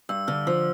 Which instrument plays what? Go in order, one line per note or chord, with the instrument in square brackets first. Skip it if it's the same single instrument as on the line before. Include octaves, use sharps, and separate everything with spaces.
[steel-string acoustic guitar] G2 [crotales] E6
[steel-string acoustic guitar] D3 [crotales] F6
[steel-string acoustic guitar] F3 [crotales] E6